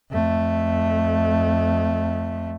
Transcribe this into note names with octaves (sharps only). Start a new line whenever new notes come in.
F2 A3